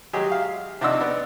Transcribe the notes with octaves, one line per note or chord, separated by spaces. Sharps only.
F#3 G#3 G4 G#4
F5
C3 D4 D#4 F#5 C6 E6
B3 D5